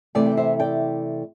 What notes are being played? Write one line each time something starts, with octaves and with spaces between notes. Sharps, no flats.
C3 E3 A3 D5 G5
G5
C5 E5
D5 G5